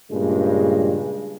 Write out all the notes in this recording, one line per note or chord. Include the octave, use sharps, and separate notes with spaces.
G2 A#2 C#3 G#3